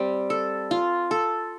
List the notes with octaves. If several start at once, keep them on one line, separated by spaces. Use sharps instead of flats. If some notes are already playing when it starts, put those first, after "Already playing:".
Already playing: G3 C4
A4
F4
A4